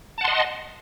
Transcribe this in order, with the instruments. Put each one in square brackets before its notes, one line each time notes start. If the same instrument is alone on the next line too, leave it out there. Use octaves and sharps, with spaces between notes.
[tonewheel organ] A5
F#5
C6
D#5